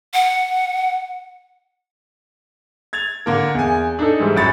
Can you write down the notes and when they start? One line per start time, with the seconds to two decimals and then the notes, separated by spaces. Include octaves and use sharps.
0.14 F#5
2.93 G#6 A6 F7
3.26 D3 A#3 A#4
3.54 E2 G#5
3.99 D4 D#4 A4
4.19 G#2 E3 G3 G#3
4.36 A1 F#2 C#5 B5 A6